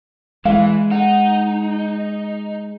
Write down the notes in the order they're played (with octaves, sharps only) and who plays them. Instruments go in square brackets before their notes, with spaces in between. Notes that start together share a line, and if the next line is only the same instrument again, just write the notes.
[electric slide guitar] E3 [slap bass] G#3 [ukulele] F5
[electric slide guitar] D#4 [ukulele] F#5